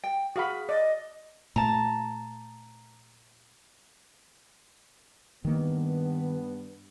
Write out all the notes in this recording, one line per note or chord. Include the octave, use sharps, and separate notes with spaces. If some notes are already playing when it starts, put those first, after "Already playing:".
G5
F#4 G#4 F5 B5
D5 D#5
A#2 A3 A5 A#5
G2 D#3 A#3 B3